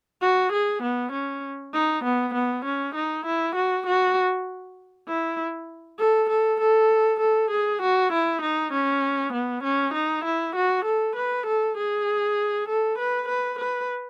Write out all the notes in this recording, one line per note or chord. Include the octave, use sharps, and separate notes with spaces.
F#4
G#4
B3
C#4
D#4
B3
B3
C#4
D#4
E4
F#4
F#4
E4
A4
A4
A4
A4
G#4
F#4
E4
D#4
C#4
B3
C#4
D#4
E4
F#4
A4
B4
A4
G#4
A4
B4
B4
B4